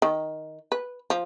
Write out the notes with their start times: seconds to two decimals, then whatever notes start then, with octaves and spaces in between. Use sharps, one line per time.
0.02 D#3
0.72 B4
1.10 F3